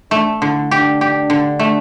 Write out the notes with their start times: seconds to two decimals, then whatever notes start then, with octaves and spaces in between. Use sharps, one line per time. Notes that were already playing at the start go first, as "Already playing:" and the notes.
0.11 A3 D4
0.41 D3 E4
0.71 D4 G4
1.01 G4
1.30 D3
1.59 A3